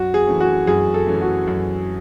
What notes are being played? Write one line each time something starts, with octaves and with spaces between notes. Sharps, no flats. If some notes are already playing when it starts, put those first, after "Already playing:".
Already playing: F#2 F#4
G#4
E3 A3 C#4
F#4
F#2 G#4
A4
E3 A3 C#4
F#4
F#2